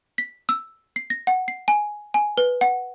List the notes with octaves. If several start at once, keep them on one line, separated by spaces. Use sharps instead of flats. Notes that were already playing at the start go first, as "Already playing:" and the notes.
B6
E6
C7
A#6
F#5
C7
G#5
G#5
B4
F#5